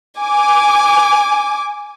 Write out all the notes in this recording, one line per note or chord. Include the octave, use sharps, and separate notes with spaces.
G#5 D6